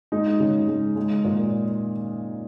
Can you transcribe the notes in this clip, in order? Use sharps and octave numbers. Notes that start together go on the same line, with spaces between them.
G#3 D#4
C#3
G#3
G#3
A#2